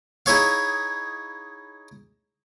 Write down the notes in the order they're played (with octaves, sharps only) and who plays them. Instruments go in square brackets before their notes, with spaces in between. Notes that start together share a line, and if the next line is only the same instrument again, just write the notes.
[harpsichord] D#4 E4 G#4 C#5 F5